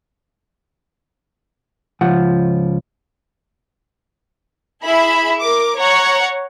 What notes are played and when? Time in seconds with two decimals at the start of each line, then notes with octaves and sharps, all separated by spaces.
2.01 C#2 F3 F#5
4.83 E4 G#4 E5 B5
5.42 A#4 D6
5.78 C#5 F#5 A#5